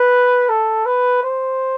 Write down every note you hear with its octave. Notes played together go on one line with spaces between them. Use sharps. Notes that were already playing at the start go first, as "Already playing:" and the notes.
Already playing: B4
A4
B4
C5